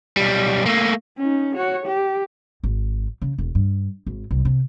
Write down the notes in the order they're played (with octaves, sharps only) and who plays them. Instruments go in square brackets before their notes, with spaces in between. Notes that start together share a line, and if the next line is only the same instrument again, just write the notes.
[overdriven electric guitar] B1 G3
A3 A#3
[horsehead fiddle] C#4 D#4
F#4 C#5
G4
[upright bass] G#1
C#3
E1
G2
G#1
C2
C3